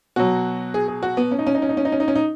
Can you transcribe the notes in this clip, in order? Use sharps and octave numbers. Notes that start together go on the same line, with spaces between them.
B2 F#3 F#4
G#4
G#4
F#4
B3
C#4
D#4
C#4
D#4
C#4
D#4
C#4
D#4
C#4
D#4
C#4
D#4